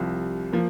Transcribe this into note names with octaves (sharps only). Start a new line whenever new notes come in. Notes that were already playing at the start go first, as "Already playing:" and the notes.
Already playing: C2 C3 F3
F3 A#3